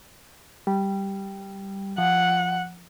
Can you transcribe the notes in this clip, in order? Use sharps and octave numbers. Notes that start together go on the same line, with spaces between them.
G3
F3 F#5